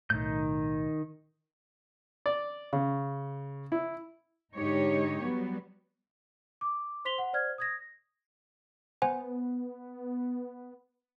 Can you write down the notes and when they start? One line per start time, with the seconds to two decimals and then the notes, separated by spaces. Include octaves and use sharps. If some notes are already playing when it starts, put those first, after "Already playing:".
0.10 B1 A2 D#3 G6
2.26 D5
2.73 C#3
3.72 E4
4.54 G#2 D3 D#4 G4 C#5
5.22 F#3 G3 B3
6.61 D6
7.05 C5 C6 B6 F7 G7
7.18 F#5
7.33 C5 D5 F6 G#6
7.58 D#6 G#6 A#6
9.02 B3 C5 F#5 G#5